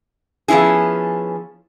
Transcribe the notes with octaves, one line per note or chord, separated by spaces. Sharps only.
F3 B3 C#4 E4 G#4